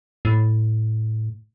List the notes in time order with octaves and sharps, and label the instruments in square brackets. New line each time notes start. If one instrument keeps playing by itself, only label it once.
[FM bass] A2